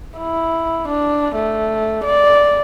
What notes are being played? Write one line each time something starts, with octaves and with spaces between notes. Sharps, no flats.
E4
D4
A3
D5